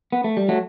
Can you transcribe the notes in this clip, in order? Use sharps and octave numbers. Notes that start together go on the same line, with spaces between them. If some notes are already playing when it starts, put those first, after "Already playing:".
B3
A3
G3
F#3 A3